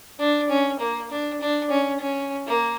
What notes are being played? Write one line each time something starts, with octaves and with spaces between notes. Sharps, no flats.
D4
C#4
A#3
D4
D4
C#4
C#4
A#3